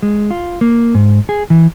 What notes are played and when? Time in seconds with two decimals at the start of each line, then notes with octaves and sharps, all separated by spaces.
0.03 G#3
0.31 F4
0.61 A#3
0.95 G#2
1.29 G#4
1.50 E3